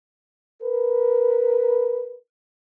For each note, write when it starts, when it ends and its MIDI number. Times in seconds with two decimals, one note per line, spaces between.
0.62 2.16 70
0.62 2.16 71